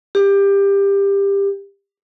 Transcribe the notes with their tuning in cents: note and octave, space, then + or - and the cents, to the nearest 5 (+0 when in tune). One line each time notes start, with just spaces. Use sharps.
G4 +20